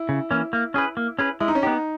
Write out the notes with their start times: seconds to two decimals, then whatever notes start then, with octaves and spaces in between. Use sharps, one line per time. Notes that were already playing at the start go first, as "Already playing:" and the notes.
Already playing: E4
0.09 C#3
0.31 E3 A#3 C#4
0.53 A#3
0.74 C#4 G#4 B4
0.97 A#3
1.19 C#4 G#4 B4
1.40 G#3 E4
1.48 D#4
1.55 C#4
1.62 B3 D#4 G4